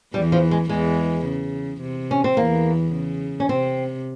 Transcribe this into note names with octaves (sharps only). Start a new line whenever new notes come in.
E2 E3 G3
F3
G#3
E2 E3 G#3
C#3
C3
C#4
C4
E2 E3 A#3
C#3
C#4
C3 C4